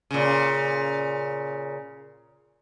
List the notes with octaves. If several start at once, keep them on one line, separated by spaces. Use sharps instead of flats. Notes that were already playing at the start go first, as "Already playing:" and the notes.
A#2 C#3